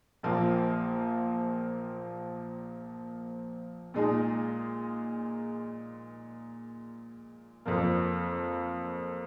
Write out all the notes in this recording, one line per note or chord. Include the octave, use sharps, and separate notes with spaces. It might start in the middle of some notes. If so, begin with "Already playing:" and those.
A#1 A#2 F3 A#3
A#2 G#3 D#4 G#4
F2 F3 A#3